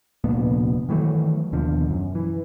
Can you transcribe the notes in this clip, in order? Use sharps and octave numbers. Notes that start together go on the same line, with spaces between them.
F1 D2 A#2 B3
D#3 E3 F#3 A3
D#2 B2 D3 F3
F#2
E3